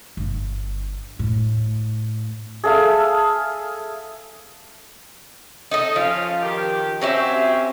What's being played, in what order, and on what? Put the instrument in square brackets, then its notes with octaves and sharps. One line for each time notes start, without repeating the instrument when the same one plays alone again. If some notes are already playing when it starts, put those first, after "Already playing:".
[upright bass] G1
A2
[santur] G#4 A4 E5 F5
[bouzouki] D#4 A4 D#5
[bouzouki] F3 [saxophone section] C#4 F4 F5
[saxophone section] D#3 G4
[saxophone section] C4 C#4 [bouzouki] F#4 G4 E5